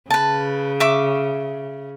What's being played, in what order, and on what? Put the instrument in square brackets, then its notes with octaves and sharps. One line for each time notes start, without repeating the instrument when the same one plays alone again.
[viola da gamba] C#3 [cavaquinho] B4 A5
[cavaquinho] E5 C#6 D6